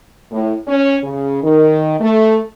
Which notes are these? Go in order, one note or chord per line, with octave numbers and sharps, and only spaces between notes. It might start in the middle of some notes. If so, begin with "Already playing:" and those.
A2
C#4
C#3
D#3
A3